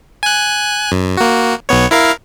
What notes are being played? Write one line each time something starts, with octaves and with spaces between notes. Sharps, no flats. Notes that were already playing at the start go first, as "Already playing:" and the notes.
G#5 F#6
F#2
A#3 F#4
B1 B3 C#5
E4 A#4 F5